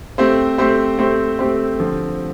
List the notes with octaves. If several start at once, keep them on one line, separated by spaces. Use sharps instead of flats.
A3 C4 G4 C5
A3 C4 G4 C5
A3 C4 G4 C5
A3 C4 G4 C5
D3 F3 C4 G4